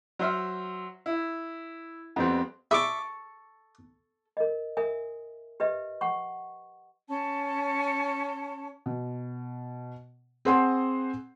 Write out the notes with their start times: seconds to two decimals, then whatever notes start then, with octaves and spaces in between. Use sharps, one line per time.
0.19 F#3 C5 E5 F6
1.06 E4
2.16 F2 G3 B3 C4
2.71 E4 G#4 A4 D5 E5 C#6 D6
4.37 A#4 D#5
4.77 A#4 E5 G#5 D#6
5.60 G4 B4 D#5 E5
6.01 F#5 C#6
7.08 C#4 A5
8.86 B2
10.45 C4 G#4 C5 F#5 G#5 C6